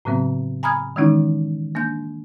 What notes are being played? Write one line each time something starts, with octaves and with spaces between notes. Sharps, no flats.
A2 C#3 F#3 B3 C4
G#5 A#5 B5 D#6 F6 G#6
D#3 E3 G#3 C#4 D#4 E4
A#3 D4 G6